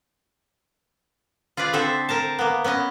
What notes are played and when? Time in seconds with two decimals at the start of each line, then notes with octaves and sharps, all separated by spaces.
1.57 F4 G#4 B4 D5
1.73 D3 C4 A4 C5 E5
2.09 A#4 C5 A5
2.39 A#3 B3
2.64 B3 C#4 B4 D#5